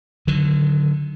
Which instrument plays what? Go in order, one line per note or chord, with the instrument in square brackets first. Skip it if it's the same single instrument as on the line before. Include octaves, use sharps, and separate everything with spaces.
[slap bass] D3 D#3 F#3